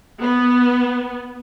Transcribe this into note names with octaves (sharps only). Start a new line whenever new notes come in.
B3